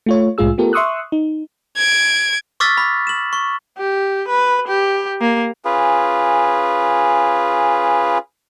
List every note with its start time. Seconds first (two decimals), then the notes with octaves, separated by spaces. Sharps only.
0.06 A3 F4 C#5
0.38 C2 A2 G#3 F4 G#4 E6
0.58 A3 B3 F4 G4 A4 A#4
0.73 E5 C6 C#6 D#6 E6 F#6
1.12 D#4
1.77 G#6 D7
2.60 C#6 D6 E6 F6 A6 B6
2.77 B5
3.07 E7 F#7
3.33 C#6
3.78 G4
4.28 B4
4.68 G4
5.21 A#3
5.65 C#4 F4 G#4 B4